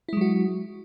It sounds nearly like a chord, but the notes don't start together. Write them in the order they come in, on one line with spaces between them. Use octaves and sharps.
E4 G#3 F#3 F#4